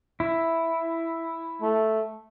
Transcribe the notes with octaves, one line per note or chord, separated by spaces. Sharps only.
E4
A3